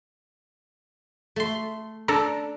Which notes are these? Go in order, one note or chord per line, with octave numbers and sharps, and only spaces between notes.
A3 C6
D4 A4 A#5